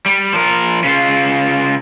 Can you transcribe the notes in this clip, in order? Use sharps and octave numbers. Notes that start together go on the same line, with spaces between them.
G3
F3 A#4
C#3 F4